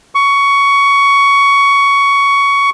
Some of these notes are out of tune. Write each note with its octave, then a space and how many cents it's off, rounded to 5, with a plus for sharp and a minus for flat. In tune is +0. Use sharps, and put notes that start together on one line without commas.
C#6 +15